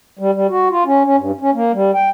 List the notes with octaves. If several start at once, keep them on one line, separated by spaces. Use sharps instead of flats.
G3
G3
F#4
F4
C#4
C#4
G2
C#4
A#3
G3
G5